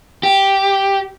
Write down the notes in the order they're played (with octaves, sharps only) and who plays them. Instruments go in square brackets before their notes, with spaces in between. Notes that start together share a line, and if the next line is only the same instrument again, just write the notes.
[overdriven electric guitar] G4